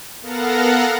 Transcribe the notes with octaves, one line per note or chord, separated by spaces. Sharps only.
B3 A4 A#4 F5 F#5 A#6